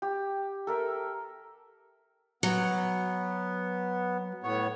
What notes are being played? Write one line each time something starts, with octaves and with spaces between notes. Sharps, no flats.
G4
A4 A#4 E5
F#3 B3
A2 B3 C#5